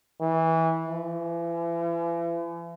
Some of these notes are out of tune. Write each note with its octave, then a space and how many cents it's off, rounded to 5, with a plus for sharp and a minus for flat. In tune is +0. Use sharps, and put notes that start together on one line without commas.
E3 -20
E3 +40